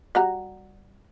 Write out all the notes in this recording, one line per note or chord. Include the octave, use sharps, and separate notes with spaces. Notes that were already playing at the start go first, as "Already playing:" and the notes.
G3 F#4 A#5